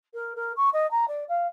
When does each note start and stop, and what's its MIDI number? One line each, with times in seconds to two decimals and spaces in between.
0.14 0.33 70
0.36 0.53 70
0.57 0.70 85
0.73 0.89 75
0.91 1.05 82
1.08 1.24 74
1.29 1.47 77